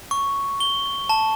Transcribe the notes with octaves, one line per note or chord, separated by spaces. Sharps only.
C#6
G7
A5